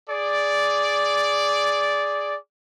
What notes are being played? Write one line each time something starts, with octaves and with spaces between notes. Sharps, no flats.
G#4 D5